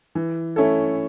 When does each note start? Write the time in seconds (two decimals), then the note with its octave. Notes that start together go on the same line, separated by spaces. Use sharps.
0.15 E3
0.56 A3 C#4 E4 A4